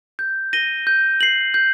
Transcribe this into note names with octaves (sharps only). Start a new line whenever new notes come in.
G6
A#6 D#7 G7
G6
C7 F#7
G6